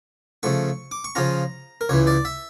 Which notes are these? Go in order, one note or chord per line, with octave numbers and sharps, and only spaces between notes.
C#3 F3 A3 C#6
D6
C#6
C#3 F3 C#4 F4 A#5
A#4
C#2 C#3 E3 C#5
D5
E5